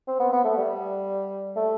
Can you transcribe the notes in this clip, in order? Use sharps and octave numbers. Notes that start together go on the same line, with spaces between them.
C4
B3
B3
A3
G3
A3